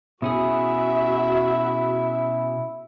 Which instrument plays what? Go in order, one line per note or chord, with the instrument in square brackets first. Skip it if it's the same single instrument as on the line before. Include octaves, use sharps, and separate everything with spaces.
[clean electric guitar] B2 C#4 G#4 [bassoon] E4 [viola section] F#4 E5